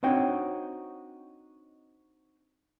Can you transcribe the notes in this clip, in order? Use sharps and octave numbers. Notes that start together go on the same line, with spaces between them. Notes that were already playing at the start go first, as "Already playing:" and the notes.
C4 D4 D#4 F#4 C#5 G5